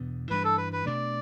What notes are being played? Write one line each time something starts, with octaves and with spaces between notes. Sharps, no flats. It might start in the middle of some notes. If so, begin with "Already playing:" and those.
Already playing: E2 B2 B3 D4
G2 E3 G3 D4 B4
A4
B4
B4
B2 A3 D4 D5